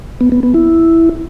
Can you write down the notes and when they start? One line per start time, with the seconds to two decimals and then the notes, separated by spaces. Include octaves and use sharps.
0.21 B3
0.32 B3
0.43 B3
0.54 E4